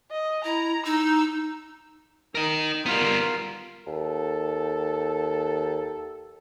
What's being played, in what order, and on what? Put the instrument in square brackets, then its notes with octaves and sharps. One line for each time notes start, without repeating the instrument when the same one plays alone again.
[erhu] D#5
[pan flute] E4 [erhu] A#5
[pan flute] D#4 [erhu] E6
[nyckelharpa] D#4 [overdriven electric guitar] A#4 D#5
[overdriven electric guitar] G3 B3 [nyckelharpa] F4 A#4
[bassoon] D#2 [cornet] A4